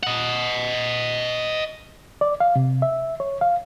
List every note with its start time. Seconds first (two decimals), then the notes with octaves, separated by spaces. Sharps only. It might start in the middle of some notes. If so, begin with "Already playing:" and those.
0.03 D#5 F#5
2.21 D5
2.40 F5
2.56 C3
2.82 E5
3.20 C#5
3.41 F5